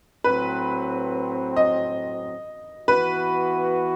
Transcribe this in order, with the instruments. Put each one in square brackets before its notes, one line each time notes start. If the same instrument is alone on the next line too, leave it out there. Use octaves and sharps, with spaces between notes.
[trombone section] A2 F#3 C4 [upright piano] B4
[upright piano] D#5
[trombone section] E3 B3 F#4 [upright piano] B4